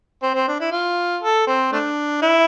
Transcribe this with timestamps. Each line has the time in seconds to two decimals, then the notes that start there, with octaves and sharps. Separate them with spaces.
0.22 C4
0.35 C4
0.48 D4
0.60 E4
0.72 F4
1.22 A4
1.47 C4
1.72 A3 D4
2.22 E4